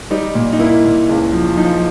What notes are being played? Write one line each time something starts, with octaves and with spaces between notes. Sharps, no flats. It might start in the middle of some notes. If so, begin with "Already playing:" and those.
G3 D#4
A#2
D#4
A#3 E4
A#2
C#2
F3
F3 D#4